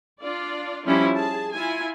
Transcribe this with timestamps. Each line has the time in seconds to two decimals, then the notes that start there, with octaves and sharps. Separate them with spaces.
0.20 D4 F4 D5
0.85 F3 G3 C#4 D4 E4 F4
1.14 G#4 A5
1.54 E4 F4 G#5